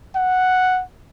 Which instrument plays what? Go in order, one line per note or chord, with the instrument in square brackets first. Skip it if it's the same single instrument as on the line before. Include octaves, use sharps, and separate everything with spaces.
[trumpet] F#5